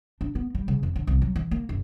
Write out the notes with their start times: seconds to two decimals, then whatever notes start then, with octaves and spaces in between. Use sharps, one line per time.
0.21 D4
0.35 B3
0.55 G3
0.68 C#3
0.83 F2
0.96 D3
1.07 C2
1.22 F#3
1.36 E3
1.51 A#3
1.69 F#1